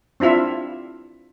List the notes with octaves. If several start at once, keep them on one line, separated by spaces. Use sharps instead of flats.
C4 D4 E4 F4 E5